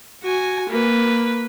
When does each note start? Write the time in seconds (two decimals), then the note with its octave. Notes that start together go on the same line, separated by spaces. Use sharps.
0.23 F#4 G#5
0.69 A#3 B4